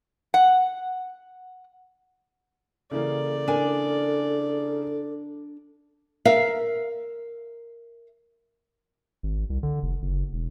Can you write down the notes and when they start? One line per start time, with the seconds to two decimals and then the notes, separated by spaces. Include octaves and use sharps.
0.34 F#5
2.91 C#3 E3 A#3 A4 D5
3.48 D4 A#4 G#5
6.25 A#4 E5 F5
9.23 G#1
9.50 C2
9.63 D3
9.83 F1
10.02 F#1
10.33 E1